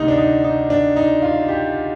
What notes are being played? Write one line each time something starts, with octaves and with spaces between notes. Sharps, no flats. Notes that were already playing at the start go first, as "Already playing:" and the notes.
Already playing: D2 C3 D#3 D#4
D4
D#4
D#4
D4
D#4
F4
G4